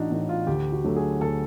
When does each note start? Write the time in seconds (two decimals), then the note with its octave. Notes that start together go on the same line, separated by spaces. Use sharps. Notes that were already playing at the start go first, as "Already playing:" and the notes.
Already playing: A1 A2 E3 D4 D#4 F#4
0.11 A2 E3 D#4
0.29 F4
0.47 D2 G4
0.72 F#4
0.84 D3 F#3 A3
0.96 G#4
1.21 D2 A4